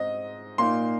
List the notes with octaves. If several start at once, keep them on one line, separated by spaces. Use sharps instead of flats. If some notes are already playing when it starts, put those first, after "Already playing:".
Already playing: G#2 C4 D#5
A#2 A#3 D#4 C6